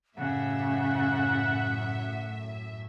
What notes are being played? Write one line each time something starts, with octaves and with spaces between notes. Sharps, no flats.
F#2 A2 C#3 E5 F#5